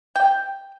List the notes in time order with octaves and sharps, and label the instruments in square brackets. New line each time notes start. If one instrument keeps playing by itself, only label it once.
[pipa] G5